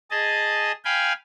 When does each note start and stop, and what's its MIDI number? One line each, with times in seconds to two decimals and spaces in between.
0.11 0.72 68
0.11 0.72 75
0.11 0.72 81
0.85 1.13 77
0.85 1.13 79
0.85 1.13 80
0.85 1.13 83